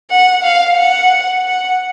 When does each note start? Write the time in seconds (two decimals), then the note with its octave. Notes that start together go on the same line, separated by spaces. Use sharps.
0.10 F#5
0.44 F5
0.77 F#5
1.44 F#5